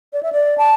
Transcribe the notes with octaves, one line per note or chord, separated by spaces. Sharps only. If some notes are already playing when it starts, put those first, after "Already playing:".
D5
E5
D5
A5